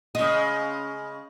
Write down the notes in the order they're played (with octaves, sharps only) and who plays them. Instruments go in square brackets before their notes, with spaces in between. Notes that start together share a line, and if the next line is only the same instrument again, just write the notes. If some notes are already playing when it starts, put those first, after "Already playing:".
[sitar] C#3 G#3 [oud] D#5